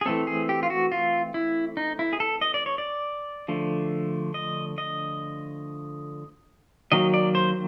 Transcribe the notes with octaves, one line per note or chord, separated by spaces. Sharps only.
G#4
E3 A3 C4 A4
G#4
G4
F4
F#4
F4
E4
D#4
E4
G#4
A4
D#5
D5
C#5
D5
D3 F3 A3
D#5
D#5
D#3 F#3 A#3 D#5
D5
C5